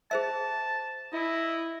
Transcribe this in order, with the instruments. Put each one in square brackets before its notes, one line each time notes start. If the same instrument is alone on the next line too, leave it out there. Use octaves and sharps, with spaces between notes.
[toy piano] G#4 C5 E5 [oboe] A5
[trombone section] E4 [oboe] D#5